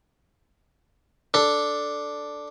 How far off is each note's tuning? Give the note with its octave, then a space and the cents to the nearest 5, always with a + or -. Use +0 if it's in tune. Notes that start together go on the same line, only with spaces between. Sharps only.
D4 +0 A4 +0